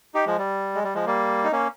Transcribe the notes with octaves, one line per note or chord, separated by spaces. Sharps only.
D#4 G4
F3 G#3
G3
G#3
G3
F3 G#3
G3 A#3
D#4
A#3 C#4